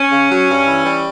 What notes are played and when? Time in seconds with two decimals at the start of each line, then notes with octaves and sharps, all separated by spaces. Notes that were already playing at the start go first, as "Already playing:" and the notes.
Already playing: C#4
0.11 C#3
0.30 F#3
0.49 G2
0.67 E3
0.86 G3